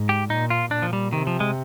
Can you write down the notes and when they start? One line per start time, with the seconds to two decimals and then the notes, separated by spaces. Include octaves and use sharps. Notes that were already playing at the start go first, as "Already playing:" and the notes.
Already playing: G#2
0.09 G4
0.30 A#2 D#4
0.50 F4
0.71 A#2 D4
0.82 F3
0.93 G3
1.13 C3 D#3
1.27 F3
1.40 G#3